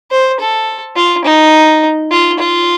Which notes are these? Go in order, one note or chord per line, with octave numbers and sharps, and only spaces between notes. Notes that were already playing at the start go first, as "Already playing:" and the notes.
C5
A4
F4
D#4
F4
F4